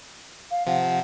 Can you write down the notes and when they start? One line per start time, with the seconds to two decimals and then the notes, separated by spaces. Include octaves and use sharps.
0.50 F5
0.66 C3 F3 F#5